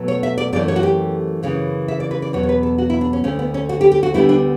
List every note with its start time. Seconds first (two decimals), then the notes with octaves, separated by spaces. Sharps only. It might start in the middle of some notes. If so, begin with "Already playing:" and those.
Already playing: B2 F#3 A3
0.08 C#5
0.23 E5
0.38 D5
0.53 F#2 E3 A3 D5
0.68 C#5
0.76 F#4
0.83 G4
1.43 F#2 C#3 E3
1.88 E5
2.00 D5
2.11 B4
2.22 D5
2.33 E2 B2 F#3 B3 C#5
2.43 C#5
2.49 B4
2.63 A4
2.78 F#4
2.90 E4
3.01 D4
3.13 C#4
3.24 D2 D3 A3 C#4
3.39 B3
3.54 C#4
3.69 F#4
3.81 G4
3.92 G4
4.03 F#4
4.14 D2 D3 G3 B3 E4
4.29 D4